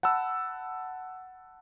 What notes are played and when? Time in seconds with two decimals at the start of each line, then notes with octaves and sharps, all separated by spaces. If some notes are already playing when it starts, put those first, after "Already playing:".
0.03 F#5 A5 B5 E6